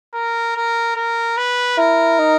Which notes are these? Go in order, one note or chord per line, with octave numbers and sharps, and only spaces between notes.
A#4
A#4
A#4
B4
E4 A#4
D#4